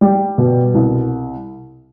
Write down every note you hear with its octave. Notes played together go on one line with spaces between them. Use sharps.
G3
B2
C2